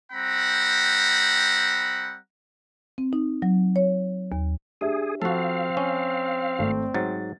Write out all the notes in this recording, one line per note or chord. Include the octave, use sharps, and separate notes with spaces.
G3 C4 F#5 A#5 B5
C4
D#4
F#3
C#5
D#2
D4 G4 G#4 E5
F3 C4 F#4 A4 F5
C#4
G#1 A3
G#2 F#3 A6